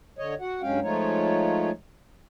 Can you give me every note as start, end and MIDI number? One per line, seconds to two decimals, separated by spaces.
0.18 0.34 50
0.18 0.34 73
0.18 0.34 75
0.40 0.62 66
0.40 0.62 78
0.62 0.80 43
0.62 0.80 54
0.62 0.80 56
0.62 0.80 61
0.62 0.80 77
0.62 0.80 79
0.82 1.71 53
0.82 1.71 56
0.82 1.71 57
0.82 1.71 63
0.82 1.71 65
0.82 1.71 73